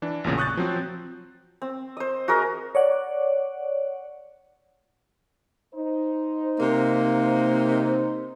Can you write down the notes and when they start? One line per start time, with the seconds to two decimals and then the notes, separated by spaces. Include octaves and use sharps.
0.02 E3 D4
0.24 A1 E2 A#2 C#3
0.38 C#6 D#6 F#6 G6 A6
0.57 F3 F#3 C4
1.62 C4
1.97 C5 D#5
2.28 F#4 G#4 A#4 D#5
2.75 C#5 D5 F#5
5.73 D#4 C5
6.60 C3 A#3